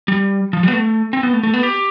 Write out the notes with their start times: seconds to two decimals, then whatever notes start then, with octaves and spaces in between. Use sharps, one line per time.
0.08 G3
0.53 F3
0.63 G3
0.68 B3
0.73 A3
1.13 C4
1.23 B3
1.33 A3
1.43 A3
1.54 B3
1.63 G4